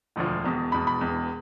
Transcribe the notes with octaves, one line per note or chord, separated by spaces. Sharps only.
E1 D2 D3 F3
E1 E2 B2
E1 E2 B2 B5
B5
E1 E2 B2